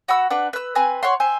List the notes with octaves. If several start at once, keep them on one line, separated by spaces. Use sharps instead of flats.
F#4 F#5 B5 E6
D4 B4 F#5
B4 E6
C4 B4 G#5
C#5 F#5 C6
C5 E5 G#5